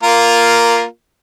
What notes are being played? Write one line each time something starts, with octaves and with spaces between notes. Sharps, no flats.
A#3 F4 A#4